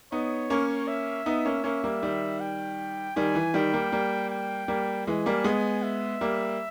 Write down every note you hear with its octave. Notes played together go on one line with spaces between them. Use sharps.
B3 D#4 C#5
A#3 C#4
E5
B3 D#4
A#3 C#4
A#3 C#4 E5
G3 A#3
D#3 G3
G5
D#3 G3 G#5
E3
D#3 G3 G5
G3 A#3
G3 A#3
G5
G3 A#3
E3 G#3 G#5
G3 A#3
G#3 B3
E5
G3 A#3